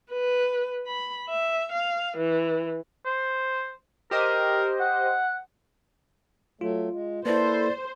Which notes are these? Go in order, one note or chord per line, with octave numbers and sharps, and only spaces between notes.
B4
B5
E5
F5
E3
C5
G4 A#4 C5 D#5
F#5
F#3 A3 F4
G#3
A#3 E4 A4 B4 C5 D5